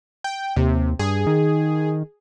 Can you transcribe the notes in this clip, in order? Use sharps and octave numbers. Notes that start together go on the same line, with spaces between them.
G5
D#2 C3
G2 G#4
D#3